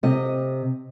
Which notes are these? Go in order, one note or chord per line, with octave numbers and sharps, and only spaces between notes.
C3 D#5